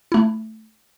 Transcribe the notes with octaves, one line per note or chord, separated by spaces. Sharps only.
A3 E4